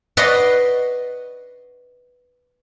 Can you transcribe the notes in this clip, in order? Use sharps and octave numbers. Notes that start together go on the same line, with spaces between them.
F#4 B4 D5 D#5 C6